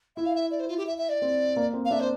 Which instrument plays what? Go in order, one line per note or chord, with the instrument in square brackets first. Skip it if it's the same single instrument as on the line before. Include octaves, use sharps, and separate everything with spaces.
[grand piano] E4 [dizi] E5
[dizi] F5
E5
D5
C5
F4
G4
E5
E5
D5
[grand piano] C4
A#3
C4
[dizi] F5
[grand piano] D4 [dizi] E5
[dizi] C5